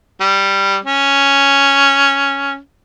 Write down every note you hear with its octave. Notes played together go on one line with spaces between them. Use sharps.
G3
C#4